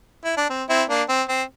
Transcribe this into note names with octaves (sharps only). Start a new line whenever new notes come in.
E4
D4
C4
C4 E4
A#3 D4
C4
C4